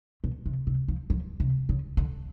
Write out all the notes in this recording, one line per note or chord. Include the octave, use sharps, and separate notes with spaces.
B2
C3
C3
F3
F3
C3
C#3
D3